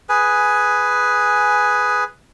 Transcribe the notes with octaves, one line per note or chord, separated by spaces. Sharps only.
G#4 B4 G#5